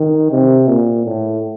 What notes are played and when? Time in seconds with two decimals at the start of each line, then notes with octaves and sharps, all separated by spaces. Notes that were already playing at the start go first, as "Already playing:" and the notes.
Already playing: D#3
0.31 C3
0.67 A#2
1.05 A2